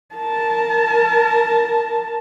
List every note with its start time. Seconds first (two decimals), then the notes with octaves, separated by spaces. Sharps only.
0.15 A#4 A5